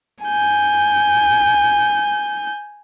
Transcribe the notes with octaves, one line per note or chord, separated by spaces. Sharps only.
G#5 G6